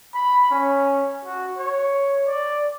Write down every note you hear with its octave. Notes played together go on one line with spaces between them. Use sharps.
B5
C#4
F#4
C#5
D5